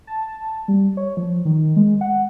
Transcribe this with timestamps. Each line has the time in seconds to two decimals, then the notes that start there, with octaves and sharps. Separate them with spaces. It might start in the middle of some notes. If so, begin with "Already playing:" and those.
0.07 A5
0.68 G3
0.97 C#5
1.17 F3
1.45 D#3
1.76 G#3
2.01 F#5